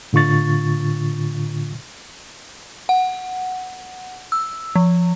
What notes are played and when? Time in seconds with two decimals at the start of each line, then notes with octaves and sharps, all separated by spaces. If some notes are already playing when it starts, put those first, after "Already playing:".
0.13 A2 D3 F4 C#6 A6
2.89 F#5
4.32 E6
4.76 F3